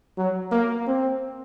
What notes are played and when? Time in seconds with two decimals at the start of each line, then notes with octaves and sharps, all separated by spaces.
0.18 F#3
0.51 A#3
0.87 C4